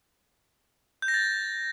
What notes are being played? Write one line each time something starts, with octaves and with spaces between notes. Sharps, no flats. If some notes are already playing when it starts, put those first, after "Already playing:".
G6
A#6
A6